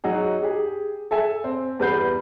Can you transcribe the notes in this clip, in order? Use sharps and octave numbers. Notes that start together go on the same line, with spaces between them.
F#3 D#4 F#4 G#4
G4 G#4
A4 E5 G#5
C4
E2 G3 B4 F#5 G6 C7